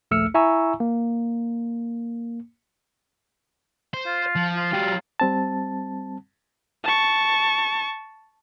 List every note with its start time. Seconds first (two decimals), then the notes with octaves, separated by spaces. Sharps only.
0.11 A#1 D#2 A3 E6 F6 C#7
0.34 E4 E5 G#5 A#5 C#6 E6
0.80 A#3
3.94 C5
4.06 F4
4.36 F3
4.57 F4
4.73 F#3 G4
5.20 G3 C4 A5
6.84 A5 C#6